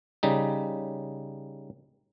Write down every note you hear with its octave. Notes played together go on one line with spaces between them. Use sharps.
C#3 G3 D#4